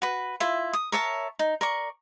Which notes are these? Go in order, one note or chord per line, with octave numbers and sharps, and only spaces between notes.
F#4 B4
E4 F4 E5
D#6
A#4 C#5 E5 A5
D#4
A#4 D5 C#6